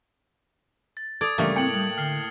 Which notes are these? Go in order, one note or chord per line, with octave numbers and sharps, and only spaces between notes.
A6
A4 D5 D#6 G#6
G2 C#3 E3 G3 A3 A#3
A2 C4 G5 C#7 F#7
G3 D#6 F#7
D3 F6 C7